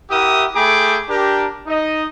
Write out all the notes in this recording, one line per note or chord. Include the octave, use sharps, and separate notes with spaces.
E4 G4 A#4 E5 F#5 D#6
A3 G#4 A4 G5 B5 D6
D4 G4 A#4
D#4 D#5